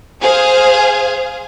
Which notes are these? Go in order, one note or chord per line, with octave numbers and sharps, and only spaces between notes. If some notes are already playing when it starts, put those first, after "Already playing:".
G#4 C5 F5 G#5